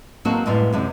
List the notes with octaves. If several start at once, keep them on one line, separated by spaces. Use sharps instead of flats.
F#3 G#3 A#3 C4 F#4 A4
F#2 A2 G3 G#3 B3 F5
F#2 C3 G#3